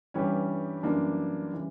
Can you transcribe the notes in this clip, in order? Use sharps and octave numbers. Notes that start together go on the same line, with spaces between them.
G2 E3 G3 C#4 G4
F#2 E3 G3 A#3 D4
C#3 E3 G3